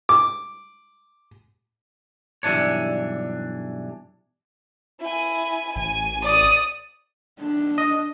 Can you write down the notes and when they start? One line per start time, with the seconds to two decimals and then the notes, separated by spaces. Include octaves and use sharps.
0.09 D6
2.43 B1 G2 C#3 E3 D4 C#5
5.00 E4 G#5
5.76 A1 G#5
6.23 D5 D#6
7.41 D4
7.78 D#5